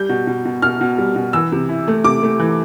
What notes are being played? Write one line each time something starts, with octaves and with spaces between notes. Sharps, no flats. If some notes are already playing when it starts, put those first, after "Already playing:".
Already playing: G3 G6
B2
B2
B2
B2 F6
B2
G3
B2
E3 E6
C3
E4
A3
C3 D6
A3
E3